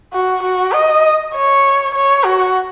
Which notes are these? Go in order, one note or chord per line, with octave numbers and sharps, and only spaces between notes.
F#4
F#4
D#5
C#5
C#5
F#4